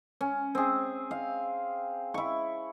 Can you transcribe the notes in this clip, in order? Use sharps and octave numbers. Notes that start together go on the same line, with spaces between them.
C#4
C4 G#4
F5
E4 C#6